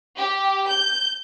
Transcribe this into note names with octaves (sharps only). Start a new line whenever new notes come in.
G4
G6